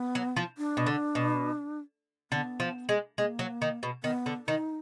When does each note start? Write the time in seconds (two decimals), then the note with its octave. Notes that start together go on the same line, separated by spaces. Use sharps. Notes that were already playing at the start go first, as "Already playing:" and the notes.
Already playing: B3
0.15 F#3
0.36 F3
0.58 D4
0.77 B2
0.86 D3
1.15 B2
2.31 D3 B3
2.60 F3
2.89 G#3
3.18 G#3 B3
3.22 A#3
3.39 F#3
3.62 D#3
3.83 B2
4.04 D#3 B3
4.26 D3
4.47 D#3 D#4